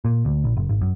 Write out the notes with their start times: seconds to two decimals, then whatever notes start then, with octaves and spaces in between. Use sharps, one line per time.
0.05 A#2
0.25 D2
0.44 A#1
0.57 F#1
0.69 G#1
0.81 F#2